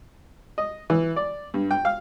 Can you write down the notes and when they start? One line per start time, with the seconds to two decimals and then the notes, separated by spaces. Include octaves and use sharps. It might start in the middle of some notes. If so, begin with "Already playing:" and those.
0.58 D#5
0.90 E3
1.16 D5
1.54 G2
1.71 G5
1.85 F5